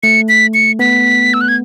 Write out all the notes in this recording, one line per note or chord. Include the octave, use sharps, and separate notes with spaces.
A3 C#7
B6
C#7
B3 B6
E6
F#6
G#6